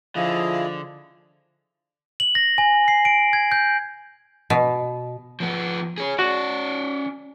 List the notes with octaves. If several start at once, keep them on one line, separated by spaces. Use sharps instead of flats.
D3 F3 E4 G#4 D#5 F5
F#7
A#6
G#5
C7
D7
G#6
G6
B2
F3 B3
G#4 C#5
C#4 F#4 D5